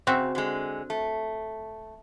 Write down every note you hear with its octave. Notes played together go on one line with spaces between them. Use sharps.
C#3 C4 F#4 E5
D3 G#3
A3